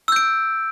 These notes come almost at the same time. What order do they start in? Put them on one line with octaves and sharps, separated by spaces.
E6 G6 D7